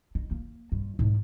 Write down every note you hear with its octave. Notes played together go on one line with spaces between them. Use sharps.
D#4
A#3
G2
G#2 D4